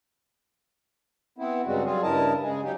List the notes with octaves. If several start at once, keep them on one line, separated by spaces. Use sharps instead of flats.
B3 C4 E4
G2 C#3 G3 G#3 C4 F#4
F#3 G3 C4 F4 G#4
G2 C#3 E4 A#4 D#5 A5
C#3 G#3 G#4
F#3 D#4 G4